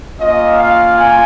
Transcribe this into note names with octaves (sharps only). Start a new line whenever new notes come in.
A#3 C#4 F4 D#5
F5
G#5